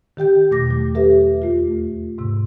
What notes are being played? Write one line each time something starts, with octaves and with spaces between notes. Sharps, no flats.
D#3 G4 G5 G6
E2 B2 A3 D6 A#6
F#3
G4 A4 B4 E5
D#2 A3 F4
G#2 C3